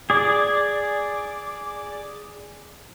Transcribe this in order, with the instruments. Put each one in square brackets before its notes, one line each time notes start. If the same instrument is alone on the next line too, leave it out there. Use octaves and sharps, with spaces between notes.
[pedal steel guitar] G#4 D5